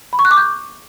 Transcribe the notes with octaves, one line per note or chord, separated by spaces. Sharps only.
B5
C#6
F#6
D6
G6